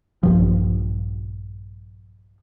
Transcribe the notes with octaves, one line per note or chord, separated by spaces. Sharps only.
A#1 G2 F3